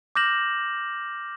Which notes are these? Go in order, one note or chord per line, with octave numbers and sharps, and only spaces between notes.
D6 F6 G6 A#6 E7 F#7